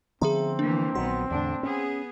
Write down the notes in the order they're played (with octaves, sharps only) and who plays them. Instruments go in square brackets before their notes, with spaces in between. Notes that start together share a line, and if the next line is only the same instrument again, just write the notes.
[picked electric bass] D3 F3 B3 [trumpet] C4 [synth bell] G#4 E5 A#5
[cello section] E3 A#3 [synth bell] D4
[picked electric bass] A#1 F#3 [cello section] D#3 B3 [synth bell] C6
[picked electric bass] E2 D3 [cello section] A2 D4
[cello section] B3 G#4 [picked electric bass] C#4